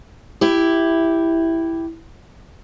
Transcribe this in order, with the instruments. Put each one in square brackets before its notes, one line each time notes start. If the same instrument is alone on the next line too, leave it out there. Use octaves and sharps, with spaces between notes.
[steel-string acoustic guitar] E4 G4